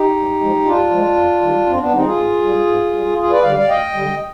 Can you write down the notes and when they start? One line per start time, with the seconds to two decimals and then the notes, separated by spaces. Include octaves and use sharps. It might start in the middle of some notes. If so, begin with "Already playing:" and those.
Already playing: D#4 G4
0.15 G2
0.41 F3 G#3
0.65 G2 D4 F4
0.90 F3 G#3
1.16 F2
1.41 D#3 G3
1.66 F2 C4
1.79 B3 D4
1.92 D#3 G3 C4 D#4
2.04 F4 G#4
2.17 G#2
2.42 G3
2.67 G#2
2.92 G3
3.18 D2 F4 G#4
3.30 B4 D5
3.43 D3 G3 D5 F5
3.56 D5 F5
3.68 D2 D#5 G5
3.93 D3 G3